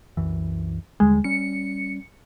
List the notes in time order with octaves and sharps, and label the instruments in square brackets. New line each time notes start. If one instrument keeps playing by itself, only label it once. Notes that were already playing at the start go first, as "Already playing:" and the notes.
[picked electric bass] C2 F#2 E3
[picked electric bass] D#2 D3 G3 [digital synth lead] G#3
[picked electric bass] G3 C#4 [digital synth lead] C#7